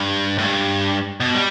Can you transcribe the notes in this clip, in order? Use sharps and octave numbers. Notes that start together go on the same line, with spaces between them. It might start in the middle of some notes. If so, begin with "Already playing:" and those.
Already playing: G2
A2
G2
B2
G3